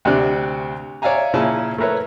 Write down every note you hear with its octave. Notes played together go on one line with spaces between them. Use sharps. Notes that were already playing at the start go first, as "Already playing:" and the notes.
D2 C3 D4 G4 D5 F#6
C#5 D5 E5 F5 G#5 A#5
A#2 C#3 C#4 E4 G#5 A5
A3 E4 A#4 B4 C#5